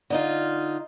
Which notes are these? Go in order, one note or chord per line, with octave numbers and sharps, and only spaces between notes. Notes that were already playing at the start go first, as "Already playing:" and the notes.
D3 D#4 F4